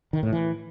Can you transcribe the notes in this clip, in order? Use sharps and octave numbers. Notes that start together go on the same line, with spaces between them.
D#3
A2
E3